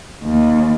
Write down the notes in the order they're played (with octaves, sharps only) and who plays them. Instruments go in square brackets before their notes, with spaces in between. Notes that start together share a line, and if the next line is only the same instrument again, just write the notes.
[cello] D#2